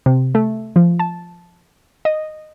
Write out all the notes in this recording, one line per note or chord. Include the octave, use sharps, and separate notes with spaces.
C3
A3
F3
A5
D#5